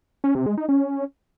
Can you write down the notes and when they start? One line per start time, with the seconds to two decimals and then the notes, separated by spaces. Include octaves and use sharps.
0.24 C#4
0.35 C3
0.46 G#3
0.57 D#4
0.69 C#4